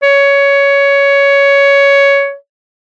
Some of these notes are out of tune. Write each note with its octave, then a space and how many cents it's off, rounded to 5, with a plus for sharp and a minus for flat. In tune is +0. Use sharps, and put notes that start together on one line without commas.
C#5 +15